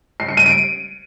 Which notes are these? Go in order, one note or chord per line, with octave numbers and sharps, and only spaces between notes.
C7
C#7
D#7
D7